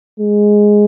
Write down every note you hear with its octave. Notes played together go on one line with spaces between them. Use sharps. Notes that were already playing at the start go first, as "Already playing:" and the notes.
G#3